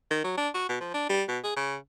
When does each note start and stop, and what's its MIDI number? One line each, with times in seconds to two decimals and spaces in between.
0.11 0.23 51
0.24 0.37 54
0.37 0.49 62
0.54 0.69 66
0.69 0.77 47
0.81 0.90 53
0.94 1.08 62
1.09 1.23 55
1.29 1.39 47
1.44 1.56 68
1.57 1.76 49